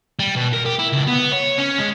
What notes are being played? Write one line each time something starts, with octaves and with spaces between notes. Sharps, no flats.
G3
B2
A#4
G4
E4
C#2
B3
C#5
C#4
G#3